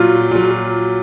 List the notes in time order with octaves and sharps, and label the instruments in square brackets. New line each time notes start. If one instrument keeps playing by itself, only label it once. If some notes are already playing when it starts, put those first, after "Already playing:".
Already playing: [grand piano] A#2 F#3 F4
A#2 F#3